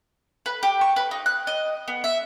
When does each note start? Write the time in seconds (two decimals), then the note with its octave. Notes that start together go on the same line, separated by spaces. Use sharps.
0.46 B4
0.63 G4
0.81 C#6
0.96 B4
1.11 D#4
1.26 F#6
1.47 D#5
1.88 B3
2.04 E5